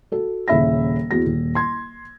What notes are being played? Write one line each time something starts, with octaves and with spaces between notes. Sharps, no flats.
F#4 A4
D#1 C#3 E5 B5 A#6
E2 F#4 A#6
D#1
C6 G#6